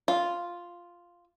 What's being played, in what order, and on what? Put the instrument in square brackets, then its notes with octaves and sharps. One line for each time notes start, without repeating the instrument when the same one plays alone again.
[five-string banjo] F4